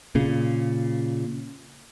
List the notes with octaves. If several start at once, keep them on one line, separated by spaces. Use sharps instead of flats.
A#2 C#3